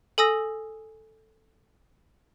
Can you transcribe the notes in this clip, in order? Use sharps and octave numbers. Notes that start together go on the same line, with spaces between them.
A4 G#5 D#6 E6 A#6